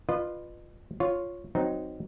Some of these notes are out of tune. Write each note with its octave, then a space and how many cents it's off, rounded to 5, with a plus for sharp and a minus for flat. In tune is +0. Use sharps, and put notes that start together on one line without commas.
F4 +0 B4 +0 D#5 -40
F4 +0 C#5 +0
F#3 +0 C4 -15 D#4 +0